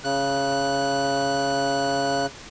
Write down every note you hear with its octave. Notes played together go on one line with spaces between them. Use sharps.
C#3 F#6